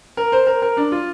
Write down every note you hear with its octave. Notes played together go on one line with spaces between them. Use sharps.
A#4
C5
A#4
A#4
D4
F4